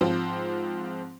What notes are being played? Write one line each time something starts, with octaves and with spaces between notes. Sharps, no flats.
G#2 F3 C4 F4